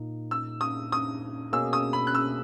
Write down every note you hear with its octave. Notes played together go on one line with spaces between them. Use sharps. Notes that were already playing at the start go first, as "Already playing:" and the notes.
Already playing: A#2 A#3 D#4
E6
D#6
D#6
B2 A#3 C#4 G#4 E6
D#6
B5
F#6
E6